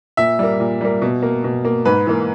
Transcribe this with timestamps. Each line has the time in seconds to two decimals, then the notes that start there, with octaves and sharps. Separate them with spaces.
0.17 A#2 E5
0.39 G3 A#3
0.60 A#2
0.81 G3 A#3
1.02 B2
1.23 A#3
1.44 B2
1.65 A#3
1.85 G#2 B4
2.07 E3 A#3